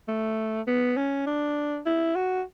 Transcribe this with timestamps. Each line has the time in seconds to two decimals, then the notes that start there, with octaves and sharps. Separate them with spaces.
0.08 A3
0.67 B3
0.97 C#4
1.27 D4
1.86 E4
2.15 F#4